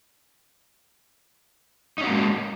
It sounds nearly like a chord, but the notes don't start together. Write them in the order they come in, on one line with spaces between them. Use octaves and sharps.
D#4 C#4 F#4 A#3 G#3